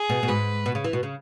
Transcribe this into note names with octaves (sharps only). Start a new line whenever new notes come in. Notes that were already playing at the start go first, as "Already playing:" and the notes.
Already playing: G#4
B2
B2
G#2 B4
B2
C#3
E3
B2
C#3